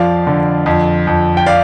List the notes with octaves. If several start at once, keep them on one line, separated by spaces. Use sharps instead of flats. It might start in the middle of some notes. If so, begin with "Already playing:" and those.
Already playing: F2 F3 D5 F5
D3
F2
F2
G5
D5 F5